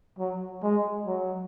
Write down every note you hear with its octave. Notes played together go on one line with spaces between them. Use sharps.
F#3
G#3
F#3